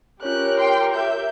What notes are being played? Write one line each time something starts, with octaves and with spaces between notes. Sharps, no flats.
C#4 F4 G4 A#4 C#5 F#6
G5 C6
E5 G6